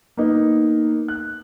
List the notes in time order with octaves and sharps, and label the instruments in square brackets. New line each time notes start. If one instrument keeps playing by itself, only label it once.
[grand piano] A#3 B3 D#4 B4
F#6